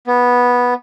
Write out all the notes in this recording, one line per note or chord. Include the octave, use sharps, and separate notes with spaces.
B3